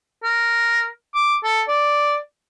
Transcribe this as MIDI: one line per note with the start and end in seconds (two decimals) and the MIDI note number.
0.24 0.87 70
1.14 1.37 86
1.44 1.61 69
1.68 2.16 74